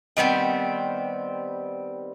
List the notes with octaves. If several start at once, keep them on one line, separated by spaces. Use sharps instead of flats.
D#3 G3 B3 C4